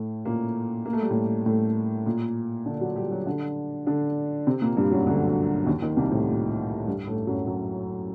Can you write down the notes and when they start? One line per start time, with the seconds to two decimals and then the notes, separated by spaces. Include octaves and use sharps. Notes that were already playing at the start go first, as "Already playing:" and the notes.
Already playing: A2 A3
0.25 A#2 A#3
0.86 A#3
0.93 A3
1.02 G3
1.10 A2 A3
1.46 A2 A3
2.06 A#2 A#3
2.66 D3 D4
2.81 F#3 F#4
2.96 G3 G4
3.11 F#3 F#4
3.26 D3 D4
3.87 D3 D4
4.47 C3 C4
4.62 A#2 A#3
4.77 G2 G3
4.91 F#2 F#3
5.06 D2 D3
5.66 D#2 D#3
5.82 D#2 D#3
5.97 C2 C3
6.11 A2
6.28 A#2
6.87 G2 G3
7.07 A2 A3
7.27 F#2 F#3
7.47 F#2 F#3